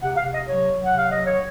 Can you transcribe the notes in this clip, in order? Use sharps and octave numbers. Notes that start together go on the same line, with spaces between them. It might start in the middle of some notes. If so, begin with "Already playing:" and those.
C3 F#5
F5
C3
D#5
F#3 C#5
F#3
F#5
C3 F5
F#3 D#5
C#5